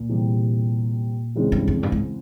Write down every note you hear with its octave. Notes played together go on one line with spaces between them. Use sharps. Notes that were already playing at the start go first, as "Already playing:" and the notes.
Already playing: A#2
E2 C3 G3
E2 C#3 E3 G#3 C4
G2
F2
G2
G#2